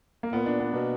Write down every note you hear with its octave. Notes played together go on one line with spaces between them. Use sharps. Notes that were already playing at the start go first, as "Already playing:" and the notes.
A#3
A#2 B3
D4
B3
B2 A#3